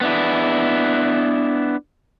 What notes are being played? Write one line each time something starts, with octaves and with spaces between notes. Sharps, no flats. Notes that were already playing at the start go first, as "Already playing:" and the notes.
B3 D4 E4